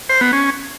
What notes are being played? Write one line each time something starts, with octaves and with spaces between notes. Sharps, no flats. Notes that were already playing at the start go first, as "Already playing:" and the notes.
C5
B3
C#4